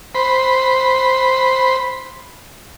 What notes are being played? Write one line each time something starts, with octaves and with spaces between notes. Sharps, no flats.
C5 B5